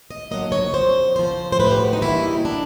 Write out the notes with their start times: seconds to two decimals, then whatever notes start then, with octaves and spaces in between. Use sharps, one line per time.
0.11 D#5
0.31 D3 F#3 A#3 D#5
0.52 C#5
0.74 F2 C5
1.16 C#3 F3 C5
1.52 C5
1.59 A2 B4
1.71 G4
1.80 F#4
1.93 D#4
2.01 E3 G3 A#3 E4
2.22 D#4
2.45 D4